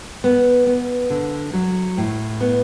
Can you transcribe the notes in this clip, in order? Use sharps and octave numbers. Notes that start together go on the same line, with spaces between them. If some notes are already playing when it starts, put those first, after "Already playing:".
B3
B3
D3
F#3
A2
B3